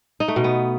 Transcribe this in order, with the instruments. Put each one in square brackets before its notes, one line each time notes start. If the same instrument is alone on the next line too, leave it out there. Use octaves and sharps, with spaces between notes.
[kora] D#4
A3
B2
B3